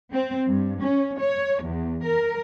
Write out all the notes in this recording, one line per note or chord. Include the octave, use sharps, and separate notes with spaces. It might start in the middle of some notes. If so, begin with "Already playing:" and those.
C4
G2
C#4
C#5
E2
A#4